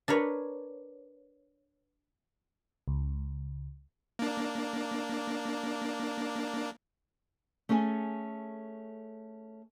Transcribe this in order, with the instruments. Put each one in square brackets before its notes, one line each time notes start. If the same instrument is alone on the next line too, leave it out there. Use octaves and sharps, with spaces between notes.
[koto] D4 A#4 B4 C#5
[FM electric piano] C#2
[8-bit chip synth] A#3 D4
[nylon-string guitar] A3 C#4 G#4 A4 G#5